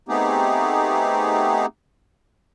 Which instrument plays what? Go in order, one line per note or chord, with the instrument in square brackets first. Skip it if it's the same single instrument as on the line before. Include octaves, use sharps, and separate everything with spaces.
[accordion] A3 B3 C4 D#4 G4 G#4